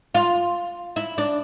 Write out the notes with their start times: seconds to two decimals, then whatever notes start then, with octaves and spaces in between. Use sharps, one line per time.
0.15 F4
0.96 E4
1.18 D4